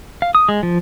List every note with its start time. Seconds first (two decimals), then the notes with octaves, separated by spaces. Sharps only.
0.22 F5
0.35 D#6
0.49 G#3
0.63 F3